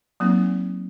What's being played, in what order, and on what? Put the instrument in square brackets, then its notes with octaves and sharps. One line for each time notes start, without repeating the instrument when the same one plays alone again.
[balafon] F#3 A#3 C4 D#4